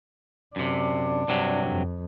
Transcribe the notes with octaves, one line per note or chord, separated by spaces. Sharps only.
F#2 C3 D4
G2 C3 F#3
F2